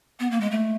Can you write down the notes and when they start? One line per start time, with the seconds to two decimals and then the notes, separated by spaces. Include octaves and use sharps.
0.20 B3
0.31 A#3
0.41 G#3
0.51 A3